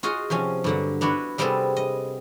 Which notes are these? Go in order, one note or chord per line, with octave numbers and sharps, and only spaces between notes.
F4 F#4 G#4 D#5 F5
C3 F3 C#4 G#5
G2 D3 F#3
B3 D4 E4 F#4
C3 G3 B3 C4 G#4 A4
D#5